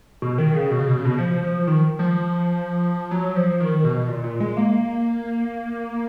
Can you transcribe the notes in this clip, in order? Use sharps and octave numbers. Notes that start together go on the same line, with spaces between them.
B2
D#3
C#3
B2
C#3
B2
C#3
B2
F3
F3
D#3
F3
F#3
F3
D#3
B2
A#2
A#2
G#3
A#3